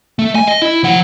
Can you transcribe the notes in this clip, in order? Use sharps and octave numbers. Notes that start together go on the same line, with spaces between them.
A3
G#5
D#5
E4
F3 F#5